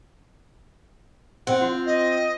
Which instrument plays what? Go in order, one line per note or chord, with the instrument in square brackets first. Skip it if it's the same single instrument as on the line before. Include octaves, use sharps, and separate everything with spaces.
[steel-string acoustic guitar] C4 [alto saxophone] F#5
[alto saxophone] F4
[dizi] D#5